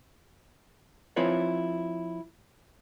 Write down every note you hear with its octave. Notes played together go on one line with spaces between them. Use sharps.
F3 C4 E4 F4 B4 C#5